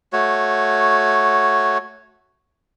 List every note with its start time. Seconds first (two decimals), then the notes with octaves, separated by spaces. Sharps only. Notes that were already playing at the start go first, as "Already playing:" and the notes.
0.13 A3 F#4 C#5